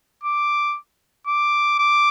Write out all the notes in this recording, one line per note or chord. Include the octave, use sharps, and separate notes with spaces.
D6
D6
D6